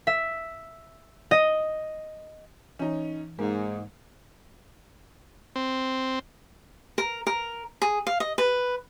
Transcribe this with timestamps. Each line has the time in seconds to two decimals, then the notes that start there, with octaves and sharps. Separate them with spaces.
0.07 E5
1.31 D#5
2.79 E3 C#4 D#4
3.39 G#2 G#3 A#3
5.56 C4
6.98 A#4
7.27 A#4
7.82 G#4
8.07 F5
8.20 D#5
8.38 B4